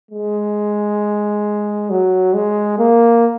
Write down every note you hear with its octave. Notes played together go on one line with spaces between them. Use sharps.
G#3
F#3
G#3
A#3